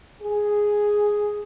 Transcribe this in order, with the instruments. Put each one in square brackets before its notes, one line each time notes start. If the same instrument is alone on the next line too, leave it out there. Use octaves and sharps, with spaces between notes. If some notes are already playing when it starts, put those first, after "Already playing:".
[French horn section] G#4